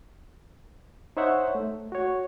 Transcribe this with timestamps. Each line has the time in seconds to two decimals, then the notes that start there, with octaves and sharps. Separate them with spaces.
1.17 D#4 C5 C#5 E5 F#5
1.55 A3
1.92 F#4 C#5